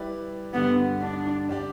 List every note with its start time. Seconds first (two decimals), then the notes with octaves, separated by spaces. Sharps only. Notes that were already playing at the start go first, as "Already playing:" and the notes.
Already playing: G3 E4 G4 B4 D5
0.53 G2 D3 G3 B3
1.01 D4
1.49 G3 D4 G4 D5